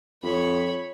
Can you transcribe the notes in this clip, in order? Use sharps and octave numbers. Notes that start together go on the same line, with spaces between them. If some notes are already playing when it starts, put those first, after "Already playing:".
F2 C#5 B5